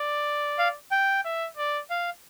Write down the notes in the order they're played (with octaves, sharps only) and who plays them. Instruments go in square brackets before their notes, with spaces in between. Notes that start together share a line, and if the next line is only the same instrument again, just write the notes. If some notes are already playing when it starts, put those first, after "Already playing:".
Already playing: [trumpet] D5
[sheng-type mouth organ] F5
G5
[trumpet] E5
D5
[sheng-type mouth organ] F5